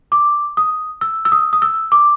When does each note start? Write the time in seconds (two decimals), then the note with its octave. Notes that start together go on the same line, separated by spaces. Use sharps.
0.12 D6
0.57 D#6
1.01 E6
1.25 E6
1.32 D#6
1.53 D#6
1.62 E6
1.92 D6